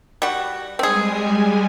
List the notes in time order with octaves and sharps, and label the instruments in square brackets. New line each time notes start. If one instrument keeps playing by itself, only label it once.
[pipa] G3 F#4
[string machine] G3 G#3 G#5 [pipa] C4 G#4